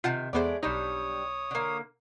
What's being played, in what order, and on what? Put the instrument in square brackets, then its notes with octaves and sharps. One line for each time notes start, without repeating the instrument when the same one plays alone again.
[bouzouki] C3 D#3 [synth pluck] F4 F#5 A5
[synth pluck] E2 B3 C5 [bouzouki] G#3 A3 D5
[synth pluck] B1 D#4 [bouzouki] G3 D4 [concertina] C#5 D#6
[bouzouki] D3 A#3